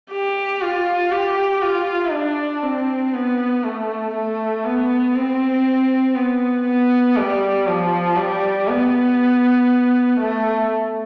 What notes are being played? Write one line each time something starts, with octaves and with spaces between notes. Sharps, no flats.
G4
F4
G4
F4
D4
C4
B3
A3
A3
B3
C4
B3
B3
G3
F3
G3
B3
A3